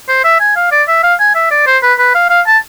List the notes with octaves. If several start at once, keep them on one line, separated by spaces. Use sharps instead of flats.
C5
E5
G#5
F5
D5
E5
F5
G#5
E5
D5
C5
B4
B4
F5
F5
A5